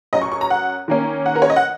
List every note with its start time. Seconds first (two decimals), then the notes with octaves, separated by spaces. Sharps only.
0.13 F#2 F#3 C#4 D#5
0.22 C#6
0.32 C#6
0.41 A#5
0.50 F#5
0.88 D#3 A#3 C#4
1.26 F#5
1.35 A#4
1.42 C#5
1.50 D#5
1.56 F#5